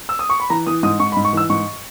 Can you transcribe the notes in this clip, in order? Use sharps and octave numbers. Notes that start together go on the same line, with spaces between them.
E6
D#6
C#6
B5
E3 A#5
E3 D#6
G#2 D#6
G#2 C#6
B5
G#2
C#6
E3 E6
G#2 C#6